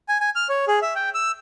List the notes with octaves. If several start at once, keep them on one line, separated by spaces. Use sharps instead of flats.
G#5
G#5
F6
C#5
G#4
E5
G5
E6